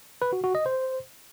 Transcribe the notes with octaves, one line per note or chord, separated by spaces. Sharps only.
B4
F#4
F#4
D#5
C5